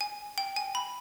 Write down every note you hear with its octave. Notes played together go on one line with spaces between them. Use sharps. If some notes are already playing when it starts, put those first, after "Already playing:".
G#5
G5
G#5
B5